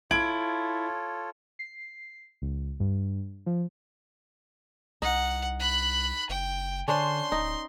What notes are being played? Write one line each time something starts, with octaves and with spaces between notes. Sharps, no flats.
E4 F4 A4 C#5 G#6 D7 F#7
C7
C#2
G2
F3
C2 D#4 F#5
B5 F#6
F#1 G5
D3 C#4 D4 C5 C6
D1 D#4